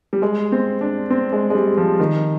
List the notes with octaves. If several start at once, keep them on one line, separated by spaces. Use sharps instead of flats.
G3
G#3
C4
D4
C4
G#3
G#3
G3
F3
D#3